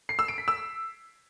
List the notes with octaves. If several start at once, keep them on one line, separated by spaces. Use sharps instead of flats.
C7
E6
D7
B6
E6